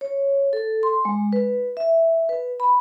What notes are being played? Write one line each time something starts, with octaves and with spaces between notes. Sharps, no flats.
C#5
A4
C6
G#3
B4
E5
B4
B5